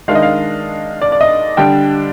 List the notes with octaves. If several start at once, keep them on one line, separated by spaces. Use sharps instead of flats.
D#3 G#3 D4 F5
D#5
F5
D5
D5
D#5
D3 G3 D4 G5